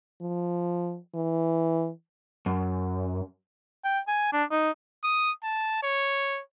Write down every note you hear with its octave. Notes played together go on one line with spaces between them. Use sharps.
F3
E3
F#2
G5
G#5
D4
D#4
D#6
A5
C#5